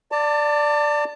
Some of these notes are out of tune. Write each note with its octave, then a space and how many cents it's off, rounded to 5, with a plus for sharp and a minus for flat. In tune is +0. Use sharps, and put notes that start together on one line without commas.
D5 +0 A5 +30